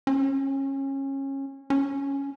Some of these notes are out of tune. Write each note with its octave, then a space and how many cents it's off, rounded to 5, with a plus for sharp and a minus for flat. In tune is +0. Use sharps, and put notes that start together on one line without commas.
C#4 -25
C#4 +5